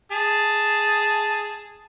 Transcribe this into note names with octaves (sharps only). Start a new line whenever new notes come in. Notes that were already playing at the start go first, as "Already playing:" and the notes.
G#4 A5